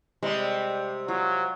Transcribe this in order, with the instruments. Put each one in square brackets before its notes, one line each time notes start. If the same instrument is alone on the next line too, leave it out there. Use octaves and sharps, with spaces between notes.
[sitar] C3 G3 [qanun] G#3
[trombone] F#3 [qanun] F4